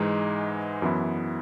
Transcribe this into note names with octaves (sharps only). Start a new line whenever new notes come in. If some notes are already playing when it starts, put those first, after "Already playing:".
Already playing: G#2 E3 G#3 D#4
F#2 E3 B3 E4